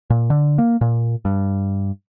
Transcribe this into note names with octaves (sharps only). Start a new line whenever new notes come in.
A#2
D3
A#3
A#2
G2